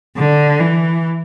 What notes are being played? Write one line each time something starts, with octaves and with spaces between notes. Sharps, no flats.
D3
E3